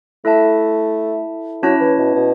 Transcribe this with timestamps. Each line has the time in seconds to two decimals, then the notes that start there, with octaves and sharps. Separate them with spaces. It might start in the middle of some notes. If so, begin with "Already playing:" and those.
0.25 A3 E4 A4 E5 A5
1.62 F#3 C#4 E4 C#5 A5
1.80 E3
1.98 B2
2.15 B2